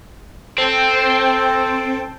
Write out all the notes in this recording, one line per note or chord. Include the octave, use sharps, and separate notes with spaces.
C4 A4 G5 A5